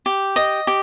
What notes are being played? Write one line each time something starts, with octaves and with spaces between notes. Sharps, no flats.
G4
D#5
G4